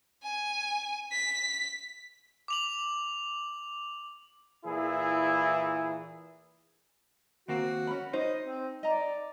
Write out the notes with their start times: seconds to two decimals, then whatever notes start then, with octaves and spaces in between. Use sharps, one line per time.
0.23 G#5
1.12 B6
2.48 D6 F7 F#7
4.65 A#2 E3 E4 G#4
7.48 D#2 A#3 C4 F#4
7.87 C#4 B5
8.13 D#4 C5 D#5
8.41 C4
8.83 D5 D#5 A#5